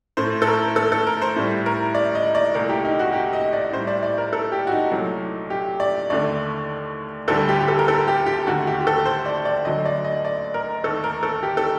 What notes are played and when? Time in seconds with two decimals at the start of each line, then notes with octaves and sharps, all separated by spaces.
0.17 A2 A3 C5
0.42 A4
0.47 A#4
0.76 A4
0.92 A4
1.07 A#4
1.22 C5
1.36 A2 G3
1.66 A#4
1.95 D5
2.15 D#5
2.35 D5
2.54 C2 A#2 A3 A#4
2.69 G4
2.85 D#4
2.99 F#4
3.13 G4
3.33 D#5
3.53 D5
3.73 A2 G3 C5
3.87 D5
4.03 D5
4.18 A#4
4.33 A4
4.52 G4
4.67 F#4
4.71 D#4
4.92 C2 A#2 F#3 A3
5.50 G4
5.80 D5
6.10 D#2 D3 A3 D5
7.28 D2 D3 G3 A4
7.49 G4
7.61 G4
7.68 A4
7.79 A#4
7.88 A4
8.08 G4
8.26 G4
8.47 D#2 D3 A3 F#4
8.67 G4
8.80 G4
8.87 A4
9.05 C5
9.26 D5
9.45 D5
9.65 D2 D3 F#3 A3 D#5
9.85 D5
10.04 D#5
10.25 D5
10.54 A#4
10.84 D#2 D#3 A3 A4
11.04 A#4
11.23 A4
11.43 G4
11.57 A4